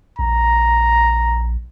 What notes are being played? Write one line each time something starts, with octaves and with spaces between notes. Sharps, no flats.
A#1 A#5